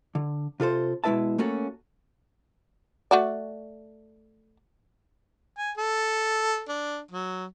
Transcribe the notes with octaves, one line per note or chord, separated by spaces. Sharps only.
D3
C3 F4 A4 C5
B2 G#3 E4 B4 E5 A5
A3 A#3 C#4 F#4 A4
A3 F#4 D5
G#5
A4
D4
F#3